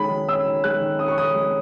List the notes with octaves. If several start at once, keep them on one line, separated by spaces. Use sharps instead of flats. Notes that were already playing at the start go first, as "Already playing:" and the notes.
Already playing: D#3 G#3 C#4 B5
D#3
C#4 E6
D#3
G#3 F#6
D#3
C#4 D#6
C#6
D#3 D#6
G#3